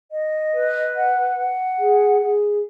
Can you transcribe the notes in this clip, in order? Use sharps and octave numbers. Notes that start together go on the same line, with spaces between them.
D#5
B4
F#5
F#5
G#4
G#4